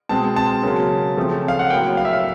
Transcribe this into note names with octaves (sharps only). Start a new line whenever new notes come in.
B2 G#3 C4 A5
A5
C#3 F#3 A#3
C#3 F3 A3 C4
F5
F#5
A2 F#3 A#3 G5
F5
E5
F5